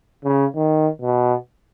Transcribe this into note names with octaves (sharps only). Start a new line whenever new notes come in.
C#3
D#3
B2